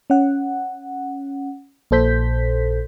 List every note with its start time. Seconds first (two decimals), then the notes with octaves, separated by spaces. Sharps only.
0.10 C#4 F#5
1.91 A#1 A#2 A4 C5 G6 B6